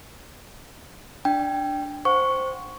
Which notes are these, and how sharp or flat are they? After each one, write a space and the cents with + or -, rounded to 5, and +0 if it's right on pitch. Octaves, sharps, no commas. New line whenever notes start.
D4 +0 G5 +0
C5 +0 F#5 -25 C#6 +0